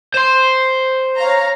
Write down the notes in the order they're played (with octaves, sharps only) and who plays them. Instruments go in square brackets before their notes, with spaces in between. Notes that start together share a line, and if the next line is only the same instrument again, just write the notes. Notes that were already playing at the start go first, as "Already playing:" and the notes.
[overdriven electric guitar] C5 C6
[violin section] C#5 F5 A#5